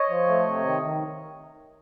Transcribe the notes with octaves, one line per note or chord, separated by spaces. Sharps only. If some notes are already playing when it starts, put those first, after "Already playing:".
Already playing: C#5 D#5
F3
A3
C3
D#3
D#3